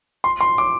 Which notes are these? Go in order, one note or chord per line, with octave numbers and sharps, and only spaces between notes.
C6
C6
D6